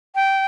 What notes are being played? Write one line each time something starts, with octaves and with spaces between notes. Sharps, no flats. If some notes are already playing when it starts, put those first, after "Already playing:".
G5